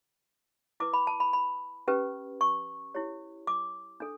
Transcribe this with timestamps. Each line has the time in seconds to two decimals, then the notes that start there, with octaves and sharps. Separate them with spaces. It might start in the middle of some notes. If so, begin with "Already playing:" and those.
0.80 E4 B4 D6
0.94 B5
1.07 A5
1.20 B5
1.33 B5
1.88 C#4 G4 B4
2.41 C#6
2.95 E4 G4 C#5
3.47 D6
4.00 D4 A4